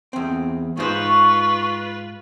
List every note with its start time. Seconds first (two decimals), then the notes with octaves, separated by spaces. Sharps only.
0.13 E2 C4
0.77 G#2 F4 B4 C5 C#6